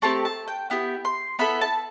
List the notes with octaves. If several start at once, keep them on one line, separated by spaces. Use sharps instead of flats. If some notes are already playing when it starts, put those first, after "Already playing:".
A3 C4 G4 A5
A5
G5
B3 E4 G4 G5
C6
B3 E4 A4 B5
A5